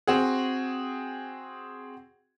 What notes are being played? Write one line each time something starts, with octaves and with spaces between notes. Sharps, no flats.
C4 F#4 G#4